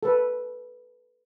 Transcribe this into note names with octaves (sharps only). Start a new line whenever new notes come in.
A4 B4